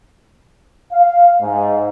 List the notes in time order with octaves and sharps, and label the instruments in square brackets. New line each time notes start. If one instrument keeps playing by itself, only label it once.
[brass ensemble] F5
G#2